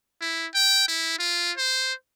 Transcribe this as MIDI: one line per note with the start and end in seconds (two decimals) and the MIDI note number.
0.21 0.47 64
0.54 0.86 79
0.88 1.14 64
1.19 1.52 65
1.57 1.93 72